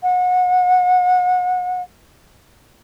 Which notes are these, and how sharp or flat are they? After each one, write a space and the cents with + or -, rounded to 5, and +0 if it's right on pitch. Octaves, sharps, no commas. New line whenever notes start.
F#5 -30